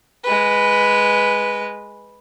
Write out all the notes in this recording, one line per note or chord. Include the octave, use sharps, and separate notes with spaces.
G#3 B4